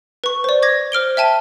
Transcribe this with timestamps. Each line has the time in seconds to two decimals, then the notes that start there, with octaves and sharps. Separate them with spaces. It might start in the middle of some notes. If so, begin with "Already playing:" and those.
0.24 B4 C#6
0.44 C5 D5
0.62 D6 G#6 A#6
0.92 C5 F6 D7 G7
1.17 E5 G5 A5 D#7